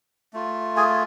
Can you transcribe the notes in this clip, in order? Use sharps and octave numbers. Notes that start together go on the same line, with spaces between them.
A3 F4
G#4 G#5